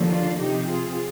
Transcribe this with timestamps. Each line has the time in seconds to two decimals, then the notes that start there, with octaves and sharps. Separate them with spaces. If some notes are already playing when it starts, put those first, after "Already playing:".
Already playing: D#2 D3 F3
0.09 D4 F4
0.39 C3 F3 C4 D#4 G4
0.69 F4 G#4